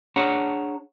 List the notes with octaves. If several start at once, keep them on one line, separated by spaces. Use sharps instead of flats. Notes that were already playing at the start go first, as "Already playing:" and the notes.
D4 G#4 C#5 F#5 A5 A#5